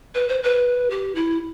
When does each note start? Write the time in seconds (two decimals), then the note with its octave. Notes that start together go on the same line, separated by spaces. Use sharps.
0.15 B4
0.29 C5
0.43 B4
0.90 G4
1.15 E4